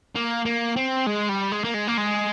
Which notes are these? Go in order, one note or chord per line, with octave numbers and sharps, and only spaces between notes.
A#3
A#3
C4
G#3
G3
G#3
A#3
G#3
A#3
G#3